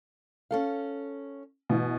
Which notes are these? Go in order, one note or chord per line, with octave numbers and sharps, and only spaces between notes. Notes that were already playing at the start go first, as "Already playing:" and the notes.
C#4 A4 F5
B2 E3